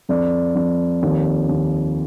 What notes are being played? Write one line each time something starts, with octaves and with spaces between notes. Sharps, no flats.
F2 D5
F2
D#2
D#2